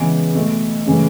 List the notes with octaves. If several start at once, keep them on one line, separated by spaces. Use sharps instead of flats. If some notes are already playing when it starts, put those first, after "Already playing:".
Already playing: C#3 E3 G#3 B3
B2 A3
C#3 E3 A3